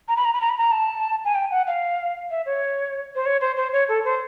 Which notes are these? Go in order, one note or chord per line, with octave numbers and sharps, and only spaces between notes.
A#5
B5
A#5
B5
A#5
B5
A#5
A5
G#5
G5
F#5
F5
E5
C#5
C5
C#5
C5
C5
C#5
A4
C5